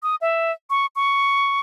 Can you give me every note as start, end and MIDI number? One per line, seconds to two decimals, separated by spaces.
0.03 0.16 87
0.21 0.52 76
0.70 0.86 85
0.96 1.61 85